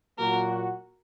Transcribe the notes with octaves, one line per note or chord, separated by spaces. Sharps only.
A#2 F#3 A#3 F#4 A#4